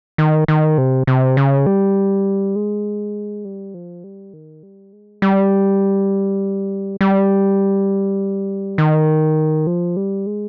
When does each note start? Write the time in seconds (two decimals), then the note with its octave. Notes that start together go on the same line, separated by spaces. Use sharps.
0.18 D#3
0.48 D#3
0.78 C3
1.07 C3
1.37 C#3
1.66 G3
2.56 G#3
3.45 G3
3.74 F3
4.04 G3
4.33 D#3
4.63 G3
4.93 G#3
5.22 G3
7.01 G3
8.78 D#3
9.67 F3
9.96 G3
10.26 G#3